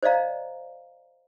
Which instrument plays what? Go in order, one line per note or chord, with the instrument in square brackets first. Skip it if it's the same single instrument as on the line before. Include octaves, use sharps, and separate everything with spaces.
[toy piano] C5 D5 D#5 F5 A#5